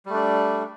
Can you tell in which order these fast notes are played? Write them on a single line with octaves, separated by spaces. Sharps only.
G3 A3 D4